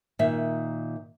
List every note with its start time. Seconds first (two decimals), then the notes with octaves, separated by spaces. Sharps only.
0.19 A#2 D#3 E5